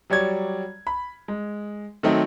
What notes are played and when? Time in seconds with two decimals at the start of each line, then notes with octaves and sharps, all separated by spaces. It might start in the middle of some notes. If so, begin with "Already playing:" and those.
0.10 F#3 G3 C#5 D5 G#6
0.87 B5
1.28 G#3
2.03 D#3 F#3 A3 C4 D#4